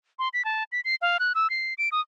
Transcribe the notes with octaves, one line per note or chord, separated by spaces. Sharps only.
C6
B6
A5
B6
C7
F5
F#6
E6
C7
D7
D#6